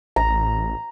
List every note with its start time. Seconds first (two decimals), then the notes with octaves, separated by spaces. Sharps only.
0.16 A1 A#5